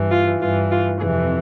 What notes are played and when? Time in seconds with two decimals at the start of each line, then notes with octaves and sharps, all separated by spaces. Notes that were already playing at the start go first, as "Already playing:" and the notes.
Already playing: G2 E3
0.10 F4
0.40 G2 E3 F4
0.70 F4
1.00 F2 C3 E3 G#4